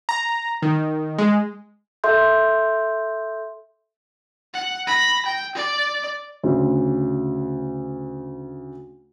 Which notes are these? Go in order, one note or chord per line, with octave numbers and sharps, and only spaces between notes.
A#5
D#3
G#3
A4 E5 C6 G6
F#5
B5 A#6
G5
D5
D2 C#3